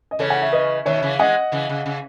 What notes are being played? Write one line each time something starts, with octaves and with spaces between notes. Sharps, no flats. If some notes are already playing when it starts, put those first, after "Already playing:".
D#5
C#3 E3 A4 C#5
F#5
E5
B4 D#5
B2 D#3 C#5 E5
C#3 E3
E3 G#3 D#5 F#5
C#3 E3
C#3
C#3